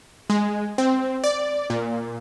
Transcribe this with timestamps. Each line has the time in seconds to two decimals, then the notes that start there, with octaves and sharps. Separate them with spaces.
0.30 G#3
0.78 C4
1.24 D5
1.70 A#2